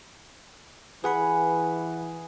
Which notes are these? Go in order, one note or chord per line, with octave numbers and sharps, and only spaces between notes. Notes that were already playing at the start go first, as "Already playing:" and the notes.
E3 G#4 B4 F#5 B5